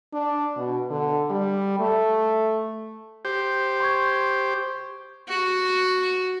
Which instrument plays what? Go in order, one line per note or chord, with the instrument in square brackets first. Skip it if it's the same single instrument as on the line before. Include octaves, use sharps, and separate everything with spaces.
[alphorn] D4
B2
D3
G3
A3
[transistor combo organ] G4 C5
[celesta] C6 C#6 G#6
[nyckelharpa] F#4